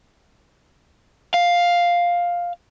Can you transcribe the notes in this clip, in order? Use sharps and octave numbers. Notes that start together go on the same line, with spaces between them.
F5